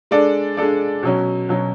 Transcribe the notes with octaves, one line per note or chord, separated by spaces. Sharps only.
G#3 D4 A4 D5
G#3 D4 A4 D5
B2 F#3 C#4
B2 F#3 C#4